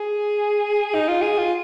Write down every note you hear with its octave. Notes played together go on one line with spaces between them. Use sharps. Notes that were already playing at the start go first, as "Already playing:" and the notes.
Already playing: G#4
D#4
F4
G#4
F4